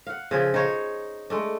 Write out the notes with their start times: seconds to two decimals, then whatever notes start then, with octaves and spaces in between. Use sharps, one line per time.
0.07 F5 F#5
0.31 C#3 F3 G#4 E5
0.54 D#4 G#4 C5 C#5
1.30 G#3 A3 D4